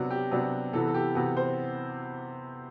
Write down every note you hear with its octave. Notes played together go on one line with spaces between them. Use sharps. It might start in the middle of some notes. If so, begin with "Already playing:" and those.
Already playing: C3 F#3 B3 D4 F#4
G4
C3 F#3 B3 D4
C3 E3 B3 A4
A4
G4
C3 E3 B3 F#4
C5